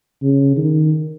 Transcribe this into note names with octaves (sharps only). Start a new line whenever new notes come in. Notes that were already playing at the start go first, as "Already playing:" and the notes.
C#3
D#3